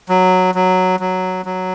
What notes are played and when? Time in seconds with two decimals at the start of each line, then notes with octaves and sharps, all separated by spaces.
0.09 F#3
0.55 F#3
1.00 F#3
1.45 F#3